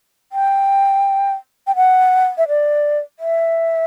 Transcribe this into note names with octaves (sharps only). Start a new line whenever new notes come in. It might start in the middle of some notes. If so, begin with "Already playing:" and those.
G5
G5
F#5
E5
D5
E5